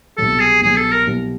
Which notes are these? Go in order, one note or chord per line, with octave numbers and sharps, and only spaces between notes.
C2 B2 F#3 A4
G#4
C2 B2 F#3 G#4
A4
A#4
C2 B2 F#3